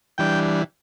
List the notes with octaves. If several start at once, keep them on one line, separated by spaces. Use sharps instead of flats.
E3 G3 D4 G5